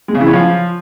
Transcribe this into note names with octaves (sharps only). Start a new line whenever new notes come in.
G#3
C#3
E3
C#4
F3